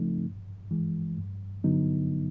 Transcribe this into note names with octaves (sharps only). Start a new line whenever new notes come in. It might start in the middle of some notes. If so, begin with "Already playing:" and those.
Already playing: C#3 F3 A3 C4 D#4
G2
E3 G#3
G2
D3 F#3 B3 D#4